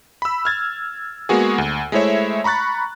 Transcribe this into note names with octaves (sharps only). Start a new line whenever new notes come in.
B5 E6
F6 G#6 A6
G#3 A#3 B3 F#4 G#4
D2
G#3 A3 E4 C5 C#5 E5
A#5 B5 C#6 F#6 A6